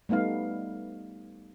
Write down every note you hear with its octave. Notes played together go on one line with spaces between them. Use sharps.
G3 A3 B3 D#4 F5